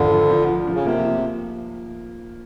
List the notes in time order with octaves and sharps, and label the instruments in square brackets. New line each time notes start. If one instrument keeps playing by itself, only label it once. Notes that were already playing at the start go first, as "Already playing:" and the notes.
Already playing: [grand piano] G#1 F3 [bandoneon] D3
[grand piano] F3
F3
F3
F3
[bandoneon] C#3
[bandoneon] C3 [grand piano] A#3
[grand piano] F3